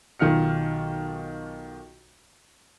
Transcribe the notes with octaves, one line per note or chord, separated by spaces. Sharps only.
B1 D#3 F4 F6 C#7